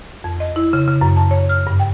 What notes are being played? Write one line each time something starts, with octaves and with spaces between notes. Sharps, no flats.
F2
D#5
E4
C#3
C#3
F#2
A5
C#5
F6
G2
G5